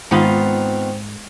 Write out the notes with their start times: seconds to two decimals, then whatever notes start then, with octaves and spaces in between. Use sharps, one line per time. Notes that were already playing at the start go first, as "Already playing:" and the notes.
0.11 G#2 D#3 G#3 B3 C4 F4 C#7 F7